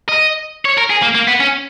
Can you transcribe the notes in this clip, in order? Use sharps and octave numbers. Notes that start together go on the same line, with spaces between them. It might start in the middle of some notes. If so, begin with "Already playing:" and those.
D#5
C#5
A#4
G#4
A#3
A#3
B3
C#4